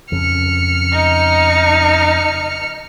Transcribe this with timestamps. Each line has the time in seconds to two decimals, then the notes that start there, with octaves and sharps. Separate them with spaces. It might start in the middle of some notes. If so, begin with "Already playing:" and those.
0.12 F2 C#3 F6 C#7
0.92 D#4